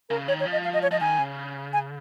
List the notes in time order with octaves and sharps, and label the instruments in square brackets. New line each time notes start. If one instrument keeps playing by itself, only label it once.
[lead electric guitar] C#3 [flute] A#4
[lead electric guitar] D#3 [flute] C#5
[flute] C#5
[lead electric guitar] F3
[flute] D#5
F5
D#5
C#5
[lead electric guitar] F3 [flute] D#5
[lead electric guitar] D#3 [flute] G#5
[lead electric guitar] C#3
[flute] G#5